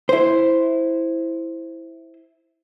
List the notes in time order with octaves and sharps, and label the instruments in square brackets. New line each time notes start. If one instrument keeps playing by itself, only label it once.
[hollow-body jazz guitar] E4 C5